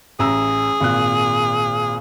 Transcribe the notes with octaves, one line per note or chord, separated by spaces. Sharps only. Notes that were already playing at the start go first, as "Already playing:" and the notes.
A1 G#4 A#5 E6
G#1 A#2 F#6